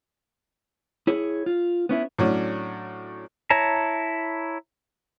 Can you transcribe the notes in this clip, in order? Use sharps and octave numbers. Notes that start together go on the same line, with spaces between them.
E4 G#4 C#5
F4
B3 C#4 E4
A2 F#3 C#4 D4
E4 C#5 A5 A#5